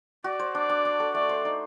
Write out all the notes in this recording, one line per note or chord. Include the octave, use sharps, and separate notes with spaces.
F#4 D5
C5
D4 D5
D4
D4
A4
A3 D5
C5
D#4